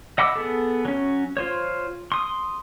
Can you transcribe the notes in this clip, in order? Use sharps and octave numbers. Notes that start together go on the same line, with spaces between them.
D#5 F#5 B5 D6 E6
B3 G#4 A4
F#3 C#4
F4 C5 C#5
C6 D#6